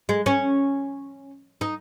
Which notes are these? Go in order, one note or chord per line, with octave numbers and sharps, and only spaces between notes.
G#3
C#4
D#4